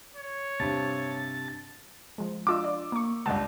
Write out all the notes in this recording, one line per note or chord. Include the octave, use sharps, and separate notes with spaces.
C#5
G2 C3 A5
F3 G#3
D4 F4 D#5 D6 E6
D5
A#3 C#6
C#2 G2 D5 F#5 A5